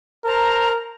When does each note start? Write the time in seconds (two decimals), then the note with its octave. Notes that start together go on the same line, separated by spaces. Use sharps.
0.25 A#4 C5 A5 A#5